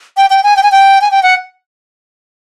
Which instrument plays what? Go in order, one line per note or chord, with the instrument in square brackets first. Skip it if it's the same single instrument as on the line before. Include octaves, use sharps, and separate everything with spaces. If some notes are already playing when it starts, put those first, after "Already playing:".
[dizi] G5
G5
G#5
G5
G#5
G5
G#5
G5
F#5